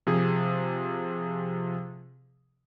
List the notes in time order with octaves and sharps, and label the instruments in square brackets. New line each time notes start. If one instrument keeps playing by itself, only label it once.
[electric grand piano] C3 F3 G#4